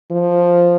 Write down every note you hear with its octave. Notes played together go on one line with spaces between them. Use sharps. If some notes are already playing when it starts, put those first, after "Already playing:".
F3